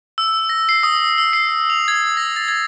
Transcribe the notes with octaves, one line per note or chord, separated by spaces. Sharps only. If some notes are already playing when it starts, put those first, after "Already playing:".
E6
A#6
C7
D#6
E6
C7
F7
G#6
A#6
A6
G#6